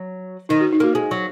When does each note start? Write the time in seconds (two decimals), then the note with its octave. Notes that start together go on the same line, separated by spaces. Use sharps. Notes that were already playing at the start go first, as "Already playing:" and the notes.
Already playing: F#3
0.49 D#3 D#4
0.61 F#4
0.73 D#4
0.80 A#3 F#4
0.95 G#3
1.11 F#3